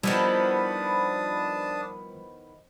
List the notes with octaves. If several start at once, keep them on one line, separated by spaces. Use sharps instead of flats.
D#3 F3 G3 B3 D4 E4 A5 D#6